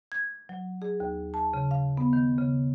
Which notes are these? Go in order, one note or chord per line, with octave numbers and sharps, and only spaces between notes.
G#6
F#3
G#4
D#2
A5
C#3
F5
B3
D#3
C#3